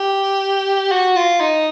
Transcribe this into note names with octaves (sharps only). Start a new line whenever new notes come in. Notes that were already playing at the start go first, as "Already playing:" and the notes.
Already playing: G4
F#4
F4
D#4